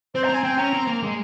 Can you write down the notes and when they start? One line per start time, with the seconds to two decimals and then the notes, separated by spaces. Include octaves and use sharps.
0.14 C4 C5
0.24 A#5
0.29 C4 G#5
0.44 C4 G5
0.58 C#4 A#5
0.73 C4
0.87 A#3
1.03 G#3